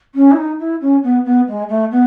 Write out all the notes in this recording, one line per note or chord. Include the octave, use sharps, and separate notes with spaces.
C#4
E4
D#4
E4
C#4
B3
B3
G#3
A3
B3